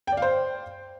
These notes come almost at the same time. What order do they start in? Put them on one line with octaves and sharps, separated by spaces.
G5 D5 F5 C5